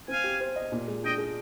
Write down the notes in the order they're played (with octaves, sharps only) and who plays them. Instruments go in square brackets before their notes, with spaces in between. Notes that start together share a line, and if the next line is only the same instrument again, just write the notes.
[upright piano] C4 [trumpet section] F5 G#5
[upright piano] G4
C5
D#5
A#2
G#3
[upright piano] D4 [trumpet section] D#5 G5
[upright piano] G#4